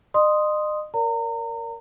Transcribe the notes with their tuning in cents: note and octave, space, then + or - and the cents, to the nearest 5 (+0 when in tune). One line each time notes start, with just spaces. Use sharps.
D#5 -40 C6 +0 D#6 +0
A#4 +0 D5 -45 A#5 -30